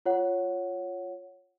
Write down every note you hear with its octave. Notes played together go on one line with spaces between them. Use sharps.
F4 C#5 F#5